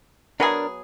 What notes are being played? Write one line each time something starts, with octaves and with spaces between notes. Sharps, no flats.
F#3 B3 D4 G#4 A#4